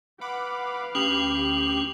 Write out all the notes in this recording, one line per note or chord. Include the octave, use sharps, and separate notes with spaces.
B4 F5 F#5 B5 D6
D2 C#4 G4 D#6 C7 F7 F#7